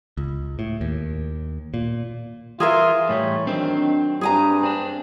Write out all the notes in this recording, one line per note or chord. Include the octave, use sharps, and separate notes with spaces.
C#2
A2
D#2
A#2
E3 F4 G#4 A#4 E5
A2 E3 G3 C#5
D#3 F#3 C4 D4
G2 G#4 G#5 A#5
C4 D4